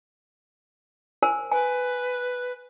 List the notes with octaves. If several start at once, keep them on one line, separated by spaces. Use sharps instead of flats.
A#4 C5 G#5
B4 G#5